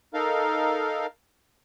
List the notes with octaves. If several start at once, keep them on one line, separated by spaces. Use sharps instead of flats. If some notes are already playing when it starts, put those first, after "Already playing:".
D#4 A4 A#4 F5